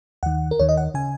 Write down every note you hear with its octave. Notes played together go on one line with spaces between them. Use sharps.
D#2 D#3 F#5
A#4
D#2 D#3 C#5
D#5
F#5
C#3 G#5